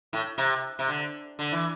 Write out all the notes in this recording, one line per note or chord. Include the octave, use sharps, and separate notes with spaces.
A2
C3
C3
D3
D3
E3